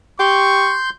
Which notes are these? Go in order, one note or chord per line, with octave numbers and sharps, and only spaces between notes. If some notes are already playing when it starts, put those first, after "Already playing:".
G4 C6 C#6 G6